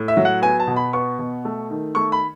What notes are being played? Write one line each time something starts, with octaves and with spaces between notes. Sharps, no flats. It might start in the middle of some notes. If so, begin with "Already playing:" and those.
Already playing: A2
E5
F#3
F#5
B3 G#5
A5
B2
B5
B3 C#6
B2
A3
D#3
A3 C#6
B5